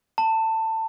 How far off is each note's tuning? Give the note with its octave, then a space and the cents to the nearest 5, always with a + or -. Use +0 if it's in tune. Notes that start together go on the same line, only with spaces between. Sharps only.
A5 +20